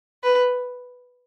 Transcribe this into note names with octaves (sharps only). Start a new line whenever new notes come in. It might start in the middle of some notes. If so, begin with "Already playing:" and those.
B4